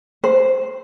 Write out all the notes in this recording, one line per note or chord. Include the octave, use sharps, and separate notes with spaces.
C5